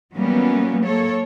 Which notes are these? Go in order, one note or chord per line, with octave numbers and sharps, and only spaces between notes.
E3 F#3 G3 A#3 B3 C#4
A#3 A4 C#5